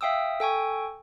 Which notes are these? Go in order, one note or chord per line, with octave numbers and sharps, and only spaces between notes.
E5 F5 G5 D#6 E6
A4 G5 G#5 C#6